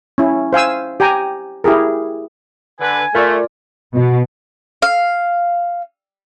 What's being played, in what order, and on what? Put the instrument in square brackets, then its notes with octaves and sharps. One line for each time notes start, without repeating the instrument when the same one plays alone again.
[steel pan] C#4 E4
C5 F5 G#5 E6
G4 G5 G#5 A#5
E4 G4 G#4 A#4
[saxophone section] D3 B4 [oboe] G#5
[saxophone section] A3 [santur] F4 D5 [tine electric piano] A#4
[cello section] B2
[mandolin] F5